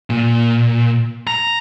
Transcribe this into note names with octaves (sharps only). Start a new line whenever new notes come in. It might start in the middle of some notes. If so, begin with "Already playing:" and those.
A#2
A#5